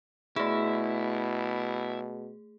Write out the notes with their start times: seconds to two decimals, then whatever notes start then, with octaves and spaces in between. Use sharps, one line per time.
0.36 B2 A3 E4 G#4